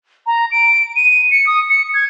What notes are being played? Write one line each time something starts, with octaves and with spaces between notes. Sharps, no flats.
A#5
D7
D#7
C#7
D#6
C#7
G#6